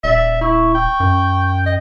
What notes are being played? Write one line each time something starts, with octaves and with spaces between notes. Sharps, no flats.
D#1 D5 E5
E4 C#6
G5
F#2
D#5